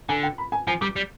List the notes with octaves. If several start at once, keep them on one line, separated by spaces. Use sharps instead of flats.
D3 G#5
G5
B5
G#5
F3 G#5
G3 D6
G3